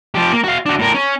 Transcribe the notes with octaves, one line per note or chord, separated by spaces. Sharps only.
F3 G4
A#3
F#4 F5
D4 F#4
A2 A#4
C#4